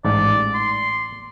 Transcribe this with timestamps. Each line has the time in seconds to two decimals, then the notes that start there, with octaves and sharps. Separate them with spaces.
0.05 A1 G#2 D5
0.54 C6